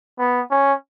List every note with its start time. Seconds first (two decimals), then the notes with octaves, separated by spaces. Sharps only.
0.19 B3
0.51 C#4